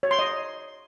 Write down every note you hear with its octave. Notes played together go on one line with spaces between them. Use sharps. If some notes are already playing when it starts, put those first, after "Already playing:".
C#5
C6
D#5